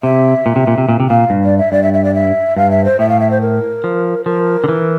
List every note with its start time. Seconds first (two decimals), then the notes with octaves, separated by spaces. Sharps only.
0.03 C3 E5
0.46 A#2
0.56 C3
0.67 A#2
0.78 C3
0.89 A#2
1.00 C3
1.09 A#2 F5
1.30 G2
1.44 D5
1.58 E5
1.72 G2 D5
1.83 E5
1.93 E5
2.04 D5
2.14 E5
2.56 G2 F5
2.71 E5
2.85 C5
2.99 A2 E5
3.09 F5
3.20 E5
3.31 C5
3.41 A#4
3.84 F3
4.26 F3 A#4
4.64 D3
4.69 E3